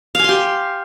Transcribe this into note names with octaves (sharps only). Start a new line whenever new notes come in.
G4 F5 G#5 C6